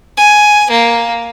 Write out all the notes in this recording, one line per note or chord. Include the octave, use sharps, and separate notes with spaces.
G#5
A#3